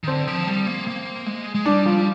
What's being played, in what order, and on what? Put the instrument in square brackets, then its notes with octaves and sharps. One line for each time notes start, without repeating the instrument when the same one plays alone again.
[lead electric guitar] D#3
[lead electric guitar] D3 [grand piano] C4
[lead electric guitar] F3
G3
A#3
A#3
G#3
G#3
[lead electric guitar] G3 [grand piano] D4
[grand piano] F3